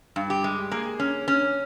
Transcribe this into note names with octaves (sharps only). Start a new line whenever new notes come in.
G2
G4
G#3
A#3 G#4
C#4
C#4